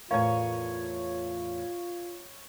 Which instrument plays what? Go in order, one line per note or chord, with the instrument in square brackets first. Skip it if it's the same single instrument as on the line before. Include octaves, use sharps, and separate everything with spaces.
[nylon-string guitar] E2 A2 A#4 [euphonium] F4 [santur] C#5 G#5 [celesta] F5